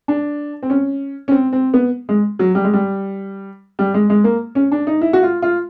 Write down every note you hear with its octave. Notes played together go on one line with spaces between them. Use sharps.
D4
C4
C#4
C#4
C4
C4
B3
G#3
F#3
G3
G#3
G3
G3
G#3
G#3
A#3
C#4
D4
D#4
E4
F#4
F4
F4